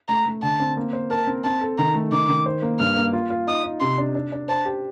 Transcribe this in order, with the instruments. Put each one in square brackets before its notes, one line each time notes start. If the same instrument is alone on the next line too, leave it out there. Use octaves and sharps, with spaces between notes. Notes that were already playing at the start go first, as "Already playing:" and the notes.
[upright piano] A3 [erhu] A#5
[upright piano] A3
[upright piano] D3 [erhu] A5
[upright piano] C4
A#3
C5
[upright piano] A#4 [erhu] A5
[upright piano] C4
[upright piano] C4 [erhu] A5
[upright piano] A4
[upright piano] D#3 [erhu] A#5
[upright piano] A3
[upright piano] D#3 [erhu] D6
[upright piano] D#3
C5
A#3
[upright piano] G2 [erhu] F6
[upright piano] A#3
F4
F4
[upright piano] D#4 [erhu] D#6
[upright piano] D#4
[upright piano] C3 [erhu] C6
[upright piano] D4
D4
D4
[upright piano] C5 [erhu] A5
[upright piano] G4